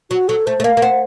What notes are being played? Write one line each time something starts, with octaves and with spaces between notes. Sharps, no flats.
F#3 F#4
F#3 A4
A3 C5
A3
A#3 F5
A#3
C4 F#5